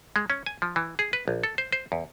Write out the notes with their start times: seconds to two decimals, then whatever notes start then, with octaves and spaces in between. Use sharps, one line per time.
0.16 G#3
0.30 C#4
0.46 G#5
0.62 F3
0.76 E3
0.99 G#4
1.13 B4
1.28 A#1
1.43 A4
1.58 C5
1.72 C5
1.92 E2